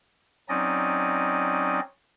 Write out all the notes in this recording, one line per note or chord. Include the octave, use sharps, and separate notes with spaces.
F#3 C4 C#4 D#4 D5 D#5